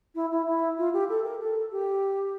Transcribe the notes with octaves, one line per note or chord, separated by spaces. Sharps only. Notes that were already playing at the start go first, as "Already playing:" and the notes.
E4
E4
E4
F4
G4
A4
A#4
A4
G4